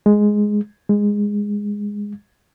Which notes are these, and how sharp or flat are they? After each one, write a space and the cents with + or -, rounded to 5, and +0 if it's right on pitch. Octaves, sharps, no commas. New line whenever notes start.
G#3 +5
G#3 -10